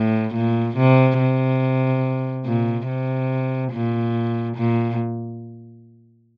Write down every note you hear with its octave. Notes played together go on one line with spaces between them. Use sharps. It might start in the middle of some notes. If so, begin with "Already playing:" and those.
Already playing: A2
A#2
C3
C3
A#2
C3
A#2
A#2